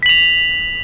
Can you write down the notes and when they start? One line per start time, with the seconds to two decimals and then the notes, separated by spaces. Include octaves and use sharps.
0.03 B6
0.06 F#7
0.09 F7